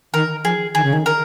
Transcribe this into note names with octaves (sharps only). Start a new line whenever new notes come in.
D#3 A#4
F3 G#4
D#3 G#4
C#3
D#3
A#4